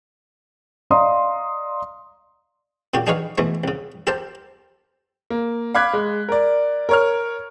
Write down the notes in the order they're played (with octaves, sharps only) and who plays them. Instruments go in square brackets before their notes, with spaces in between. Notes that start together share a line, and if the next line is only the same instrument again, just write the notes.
[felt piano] D5 D#5 F5 A#5 C6 D#6
[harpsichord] A#2 C#3 F#4 G4
D4 D#4 G#4 B4 C#5 F5
B2 E3 G#3 A3
C2 C#3
G4 A4 A#4 C5 G5 A5
[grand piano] A#3
F5 B5 D6 F#6 G#6 B6
G#3
A#4 D5
A#4 C#5 F6